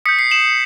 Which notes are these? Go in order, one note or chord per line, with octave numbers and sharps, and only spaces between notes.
D#6 G6 B6 C#7
C7
E7 F#7